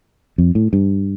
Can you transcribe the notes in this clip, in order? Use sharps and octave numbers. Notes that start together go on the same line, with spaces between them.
F2
A2
G2